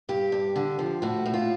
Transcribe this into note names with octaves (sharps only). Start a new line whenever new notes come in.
G2 G4
G2
D3
F3
A2 F#4
A2
F4